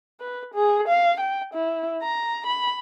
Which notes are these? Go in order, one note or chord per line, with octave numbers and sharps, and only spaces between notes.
B4
G#4
F5
G5
E4
A#5
B5